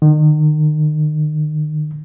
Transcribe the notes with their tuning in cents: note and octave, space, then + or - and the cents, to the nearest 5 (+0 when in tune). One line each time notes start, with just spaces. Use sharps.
D#3 -35